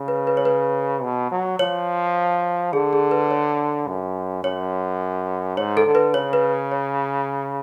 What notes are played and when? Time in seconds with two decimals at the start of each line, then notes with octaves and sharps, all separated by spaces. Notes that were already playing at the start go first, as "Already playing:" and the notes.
Already playing: C#3
0.08 B4
0.27 B4
0.37 C#5
0.45 B4
1.03 B2
1.32 F#3
1.59 F3 C#5
2.73 D3 G#4
2.93 G#4
3.11 B4
3.31 C#5
3.87 F#2
4.43 F#2 C#5
5.57 G#2 C#5
5.77 A4
5.87 D3
5.95 B4
6.14 C#3 C#5
6.33 B4
6.71 C#5